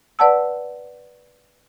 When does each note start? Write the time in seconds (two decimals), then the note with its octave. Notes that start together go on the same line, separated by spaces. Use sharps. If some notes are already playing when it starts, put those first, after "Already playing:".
0.19 B4 D5 F#5 A5 E6